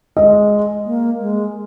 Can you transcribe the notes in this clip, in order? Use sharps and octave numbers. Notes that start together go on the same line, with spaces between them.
G#3 D#5
A#3
G#3